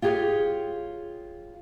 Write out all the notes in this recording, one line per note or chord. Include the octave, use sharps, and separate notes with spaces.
F4 G4 G#4 C5 C#5 F5